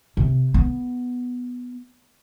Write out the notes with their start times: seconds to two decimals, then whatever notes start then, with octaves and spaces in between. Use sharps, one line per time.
0.17 C3
0.54 B3